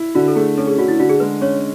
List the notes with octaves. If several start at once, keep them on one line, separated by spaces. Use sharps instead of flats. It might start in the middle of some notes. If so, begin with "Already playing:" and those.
Already playing: E4
D3 F#4
A4
A3 G#4
C#4 A4
G#4
D3 F#4
E4
D3 F#4
G#4
G#3 B4
C#4 C#5